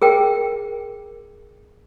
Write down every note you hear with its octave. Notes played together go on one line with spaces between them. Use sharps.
G#4 A#4 G5